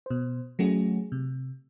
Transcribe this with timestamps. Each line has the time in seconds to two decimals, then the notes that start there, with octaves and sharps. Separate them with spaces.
0.06 B2 C5
0.59 F#3 A3 C#4 F#4 G#4
1.12 C3